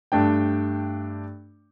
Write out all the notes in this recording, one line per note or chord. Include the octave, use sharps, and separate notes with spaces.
G2 A3 D4 G5